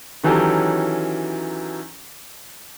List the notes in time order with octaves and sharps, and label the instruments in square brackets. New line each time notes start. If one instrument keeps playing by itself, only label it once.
[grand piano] D#3 E3 F#3 C#4 G4 A4